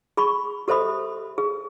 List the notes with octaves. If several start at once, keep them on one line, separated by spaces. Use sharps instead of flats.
G#4 B5 C#6
G4 A4 C5 E5 B5 D#6
G#4